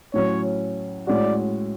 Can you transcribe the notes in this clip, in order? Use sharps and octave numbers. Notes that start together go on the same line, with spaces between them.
A2 F#3 C#4 C#5
A2 G#3 C#4 F#4 D5